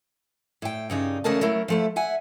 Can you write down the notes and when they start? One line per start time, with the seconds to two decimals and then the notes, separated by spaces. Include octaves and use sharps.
0.62 A2 G5
0.90 G2 C#3 D#4
1.24 E2 C#3 A3 A#4 D#5 A5
1.41 F#3 A3 E4 A#4
1.68 F3 A3 E4
1.96 E5 F#5 G#5